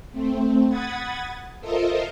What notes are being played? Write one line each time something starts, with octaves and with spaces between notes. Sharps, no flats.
A3 C4
F#5 B5 D#6 G#6 A6
F4 A4 A#4 C5 D#5 E5